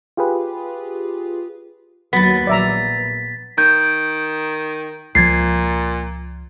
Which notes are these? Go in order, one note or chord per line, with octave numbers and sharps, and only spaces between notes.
F4 G4 G#4 B4
D#2 D#3 F#3 B3 A6 B6
A#1 D5 E5 A#5
D#3 G6
C#2 A#2 F3 G#6 A6 C7